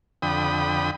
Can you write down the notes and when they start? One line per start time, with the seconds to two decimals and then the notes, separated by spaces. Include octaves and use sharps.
0.22 F2 D3 G5 B5 D#6